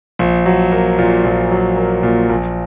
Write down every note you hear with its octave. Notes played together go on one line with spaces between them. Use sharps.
A#1
F#3
A#3
A#2
A#1
F#3
A#3
A#2
A#1